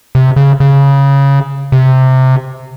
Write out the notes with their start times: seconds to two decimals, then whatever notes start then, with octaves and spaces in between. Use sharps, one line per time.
0.15 C3
0.36 C#3
0.60 C#3
1.72 C3